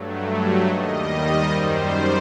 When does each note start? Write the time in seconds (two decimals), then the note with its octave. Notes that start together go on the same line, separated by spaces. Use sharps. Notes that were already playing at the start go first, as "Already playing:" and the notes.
Already playing: G2 F#3 A3
0.67 D#2 D#3 G3 D#5
1.50 F#2 D#3 G3 C5